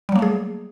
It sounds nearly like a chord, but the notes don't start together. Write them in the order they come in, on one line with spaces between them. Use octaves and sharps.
G3 F#3 A#3 A3 G#4